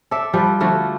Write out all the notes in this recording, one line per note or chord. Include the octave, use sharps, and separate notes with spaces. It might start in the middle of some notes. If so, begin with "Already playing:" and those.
A4 D5 E5
F3 G3 B4
D3 F3 A3 F#4